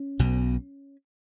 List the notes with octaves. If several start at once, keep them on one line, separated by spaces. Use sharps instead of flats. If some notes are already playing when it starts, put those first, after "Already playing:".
Already playing: C#4
B1 B2